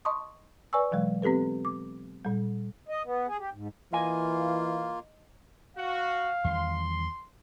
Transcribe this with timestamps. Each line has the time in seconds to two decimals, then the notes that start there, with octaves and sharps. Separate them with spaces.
0.05 D#5 A5 C6 C#6 D#6
0.73 B4 D5 G#5 C#6 E6
0.92 B2 E3 F#3 G#3
1.22 B3 C4 G4 A4 B4
1.65 D6
2.25 A#2 G3
2.88 D#5
3.05 B3
3.27 G#4
3.39 G4
3.54 G#2
3.93 E3 A#3 F4 D#5 G#5
5.77 F#4 F5
6.44 E2 D#3 G3 C6